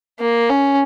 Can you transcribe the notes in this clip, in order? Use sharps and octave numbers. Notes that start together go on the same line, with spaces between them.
A#3
C#4